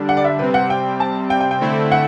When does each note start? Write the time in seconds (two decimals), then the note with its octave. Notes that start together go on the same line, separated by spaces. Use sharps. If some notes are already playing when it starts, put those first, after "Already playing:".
Already playing: D3 G3 D4
0.09 F#5
0.17 D5
0.24 E5
0.39 C3 G3 C4 B4
0.54 F#5
0.70 G5
1.00 A5
1.30 G5
1.40 G5
1.51 G5
1.61 D3 A3 C4 E4
1.92 F#5